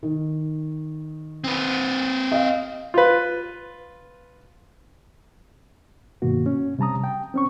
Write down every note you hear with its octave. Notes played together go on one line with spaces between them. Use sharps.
D#3
C4 B4
D#5 F5
F4 B4
G2 B2 D#3 A#3 F#4
C#4
C3 G3 A5 A#5 D#6
G5
C4 C#4 C#6